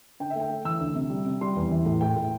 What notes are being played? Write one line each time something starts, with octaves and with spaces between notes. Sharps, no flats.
D3 G5
E5
A3 G5
A3
E3 E6
D2
C3
G3
C3
G3 C6
E2
E3
A2
A2 G5
A2